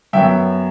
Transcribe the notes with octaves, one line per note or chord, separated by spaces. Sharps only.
F#2 F#3 B3 E5 G5